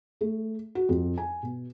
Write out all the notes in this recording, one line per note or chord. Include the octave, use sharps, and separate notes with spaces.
A3
F#4
F2
G#5
B2